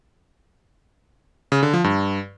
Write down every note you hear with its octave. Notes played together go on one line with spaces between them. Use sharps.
C#3
D3
F3
G2